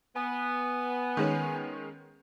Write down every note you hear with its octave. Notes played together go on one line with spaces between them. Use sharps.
B3 G#5
D#3 G#3 C#4